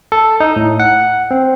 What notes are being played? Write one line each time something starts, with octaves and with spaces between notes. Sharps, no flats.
A4
D#4
A2
F#5
C4